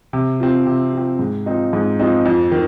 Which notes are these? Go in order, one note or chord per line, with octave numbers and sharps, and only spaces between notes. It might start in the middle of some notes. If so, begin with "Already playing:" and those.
C3
F3 C4
C3
F3 C4
G#2
F3 C4 D#4
G#2
F3 C4 D#4
F2
D#3